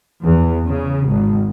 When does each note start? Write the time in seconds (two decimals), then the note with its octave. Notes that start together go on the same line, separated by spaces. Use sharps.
0.22 E2
0.69 C#3
1.08 G#1